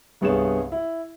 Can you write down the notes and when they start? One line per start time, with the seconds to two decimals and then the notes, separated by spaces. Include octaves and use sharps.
0.21 C2 G2 B3 G#4 C#5 E7
0.72 E4